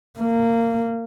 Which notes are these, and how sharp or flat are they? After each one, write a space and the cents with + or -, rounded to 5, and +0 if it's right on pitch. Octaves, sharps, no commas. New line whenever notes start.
A#3 -20